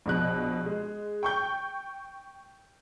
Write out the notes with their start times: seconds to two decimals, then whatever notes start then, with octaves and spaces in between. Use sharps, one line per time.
0.06 A#1 B2 F#6
0.66 G#3
1.23 G5 C#6 G6